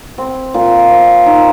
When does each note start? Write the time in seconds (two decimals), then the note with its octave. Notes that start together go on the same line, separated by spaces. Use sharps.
0.18 C4
0.54 A#2
0.91 C4
1.26 D#4